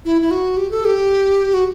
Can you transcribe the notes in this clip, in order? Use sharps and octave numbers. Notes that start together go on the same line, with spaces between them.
E4
E4
F#4
G4
A4
G4
F#4